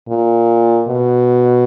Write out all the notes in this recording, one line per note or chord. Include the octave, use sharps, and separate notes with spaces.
A#2
B2